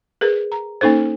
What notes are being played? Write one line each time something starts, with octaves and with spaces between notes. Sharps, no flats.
G#4 A#4 B4
A#5
A#3 C#4 D#4 A4 C5